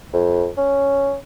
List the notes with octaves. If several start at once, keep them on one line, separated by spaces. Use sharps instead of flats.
F2
C#4